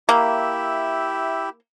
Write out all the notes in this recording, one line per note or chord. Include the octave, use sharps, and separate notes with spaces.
A#3 E4 G4 E5